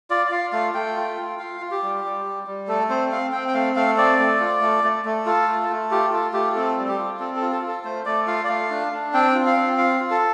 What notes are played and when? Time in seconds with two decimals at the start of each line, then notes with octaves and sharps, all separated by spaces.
0.10 F4 D5
0.27 D5
0.32 F4 F5
0.52 A3 F5
0.74 A3 G5
0.96 F4
1.17 F4
1.39 F4 F5
1.61 F4
1.71 G4
1.83 G3
2.04 G3
2.25 G3
2.47 G3
2.68 A3 A4
2.89 C4 C5
3.12 C4 F5
3.32 C4 G5
3.48 G5
3.54 A3 F5
3.76 A3 F5
3.97 C4 D5
4.19 A3
4.40 F4
4.61 A3
4.84 A3
5.05 A3
5.26 F4 A4
5.48 A3
5.70 A3
5.91 F4 G4
6.12 F4 A4
6.33 A3 G4
6.55 C4 A4
6.77 G3
6.88 G4
6.98 F4
7.19 C4 A4
7.36 A4
7.41 F4
7.52 A4
7.62 F4
7.68 A4
7.84 A3 C5
8.05 A3 D5
8.27 F4 F5
8.44 D5
8.49 A3 F5
8.71 D4
8.93 D4
9.14 C4 G5
9.35 F4
9.46 F5
9.57 C4
9.78 F4 F5
10.00 F4
10.11 A4